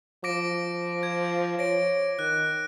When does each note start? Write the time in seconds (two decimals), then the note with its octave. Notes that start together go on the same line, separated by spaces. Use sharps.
0.24 F3 D6 A#6 D7
1.03 G#6
1.59 C#5 A#6 D7
2.19 D#3 F#6